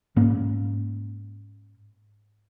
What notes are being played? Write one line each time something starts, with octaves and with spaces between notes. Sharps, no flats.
G#2 A#3 C#4